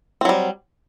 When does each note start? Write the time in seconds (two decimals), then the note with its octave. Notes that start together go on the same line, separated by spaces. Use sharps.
0.21 C4
0.25 F#3
0.29 G3